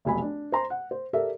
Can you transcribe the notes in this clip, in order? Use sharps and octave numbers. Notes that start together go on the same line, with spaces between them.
F1 B1 G#5 B5
D4
C5 A#5 C6
F#5
C5
G4 A4 A#4 D5 E5